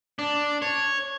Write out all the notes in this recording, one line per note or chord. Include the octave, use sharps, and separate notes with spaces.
D4
C#5